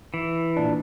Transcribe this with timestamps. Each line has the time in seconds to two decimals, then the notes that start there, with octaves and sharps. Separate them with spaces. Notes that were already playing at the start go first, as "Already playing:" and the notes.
0.14 E3
0.57 A#2 D4